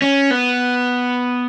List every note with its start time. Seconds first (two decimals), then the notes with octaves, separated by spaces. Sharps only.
0.02 C#4
0.31 B3